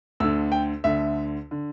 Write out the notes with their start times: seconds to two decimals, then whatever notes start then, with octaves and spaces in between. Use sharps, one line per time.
0.20 D2 D3 E6
0.52 G5
0.84 D2 D3 E5
1.51 D3